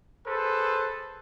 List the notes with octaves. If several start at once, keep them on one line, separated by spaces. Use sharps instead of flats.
G#4 A4 B4 C5